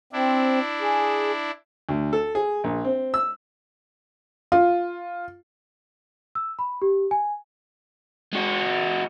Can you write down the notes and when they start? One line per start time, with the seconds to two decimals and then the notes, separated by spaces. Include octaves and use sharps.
0.13 C4 D4 E4
0.81 G#4
1.89 D2
2.13 A4
2.35 G#4
2.64 A#1
2.85 C4
3.14 E6
4.52 F4
6.35 E6
6.59 B5
6.82 G4
7.11 G#5
8.33 G#3 F#4